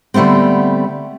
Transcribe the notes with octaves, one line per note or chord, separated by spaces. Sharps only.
D3 G3 A3 B3 C4